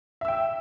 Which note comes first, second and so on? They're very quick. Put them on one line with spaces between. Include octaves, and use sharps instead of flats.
E5 E6 G5